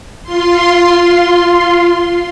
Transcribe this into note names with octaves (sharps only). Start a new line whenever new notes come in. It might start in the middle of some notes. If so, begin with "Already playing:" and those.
F4 C6